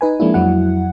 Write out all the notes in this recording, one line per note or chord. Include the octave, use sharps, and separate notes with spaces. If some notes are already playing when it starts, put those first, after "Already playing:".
D#4 B4 G#5
F3 G#3 A#3 D4 E4
F2 F#3 E4 F#5